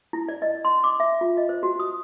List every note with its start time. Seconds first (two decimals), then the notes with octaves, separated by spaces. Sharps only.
0.13 E4
0.28 D5
0.42 D#5
0.65 C6
0.84 D6
1.00 E5
1.21 F4
1.37 D#5
1.49 C5
1.63 F#4
1.80 D#6